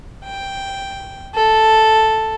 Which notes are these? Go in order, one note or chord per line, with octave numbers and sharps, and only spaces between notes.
G5
A4